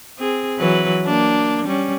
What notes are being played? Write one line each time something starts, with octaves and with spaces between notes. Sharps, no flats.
C4 G#4
E3 F#3 B4
A#3 D4
G3 C#4